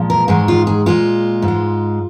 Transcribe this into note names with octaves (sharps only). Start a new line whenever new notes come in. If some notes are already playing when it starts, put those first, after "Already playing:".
Already playing: A#2 F3 G#3
A#4
G#2 D#3 G#3 G#4
F4
G#4
A#2 G#3 F4
G#2
G#3